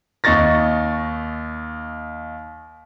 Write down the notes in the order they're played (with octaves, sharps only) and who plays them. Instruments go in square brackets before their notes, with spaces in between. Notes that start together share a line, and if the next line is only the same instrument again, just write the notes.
[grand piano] D#2 D#4 C#6 A6 A#6